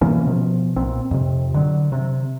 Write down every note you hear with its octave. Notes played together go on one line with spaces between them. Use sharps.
B2 E3 A#3 C#4
B2 F3
B1 A#2 C4
F2 C3
D3 F#3
C3